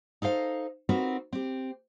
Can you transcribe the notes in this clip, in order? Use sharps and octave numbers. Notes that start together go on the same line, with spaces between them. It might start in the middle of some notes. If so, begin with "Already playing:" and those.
D#4 A4 C5 F5
C4 D#4 F4 F#4 A#4 B4
C4 G4